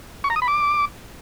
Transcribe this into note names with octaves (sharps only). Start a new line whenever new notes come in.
C#6
A#5
D#6
B5
D6